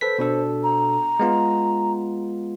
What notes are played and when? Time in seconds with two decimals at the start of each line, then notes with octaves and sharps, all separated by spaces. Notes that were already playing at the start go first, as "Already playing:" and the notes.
0.01 A4 B4 C5 B6
0.19 B2 D4 A4
0.63 A#5
1.19 G#3 B3 F4